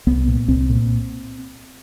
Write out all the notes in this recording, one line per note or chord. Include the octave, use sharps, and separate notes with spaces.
C2 B3
A#2
C2 C4
A#2